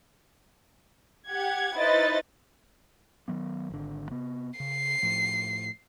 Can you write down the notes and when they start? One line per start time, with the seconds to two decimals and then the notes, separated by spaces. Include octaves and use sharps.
1.27 G4 F#5 G#6
1.77 D#4 E4 B4 C5 D#5 A6
3.28 D#3 F#3 B3
3.70 G#1 D3
4.11 C3 B3
4.60 C#3 C7
5.03 A2 F3